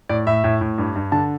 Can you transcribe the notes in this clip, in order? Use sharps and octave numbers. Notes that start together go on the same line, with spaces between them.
A2 D5
A2 E5
A2
A2
G2
G2
D3 A5